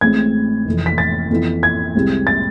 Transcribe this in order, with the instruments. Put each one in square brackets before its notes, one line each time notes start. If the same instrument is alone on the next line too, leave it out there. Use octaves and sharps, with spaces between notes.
[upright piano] A1 A2 G#3 C4 G#6
F1 F2 E3
B6
A6
F2 E3 B3 E4
G#6
C2 C3 G#3 C4
A6